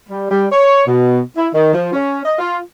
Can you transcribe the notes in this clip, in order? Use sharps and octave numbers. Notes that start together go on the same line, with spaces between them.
G3
G3
C#5
B2
E4
D#3
F3
C#4
D#5
F4